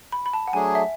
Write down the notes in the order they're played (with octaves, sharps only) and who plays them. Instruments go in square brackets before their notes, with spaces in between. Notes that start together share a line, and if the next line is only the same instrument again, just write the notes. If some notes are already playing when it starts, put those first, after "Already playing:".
[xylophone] B5
B5
A5
F#5
[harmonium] F#3 A3 D4 G#4 [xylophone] G#5
[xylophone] E5